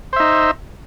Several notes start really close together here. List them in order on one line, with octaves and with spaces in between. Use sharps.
C5 E5 D#4